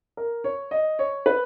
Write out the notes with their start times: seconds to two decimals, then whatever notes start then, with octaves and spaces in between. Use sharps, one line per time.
0.17 A#4
0.44 C#5
0.71 D#5
0.99 C#5
1.26 B4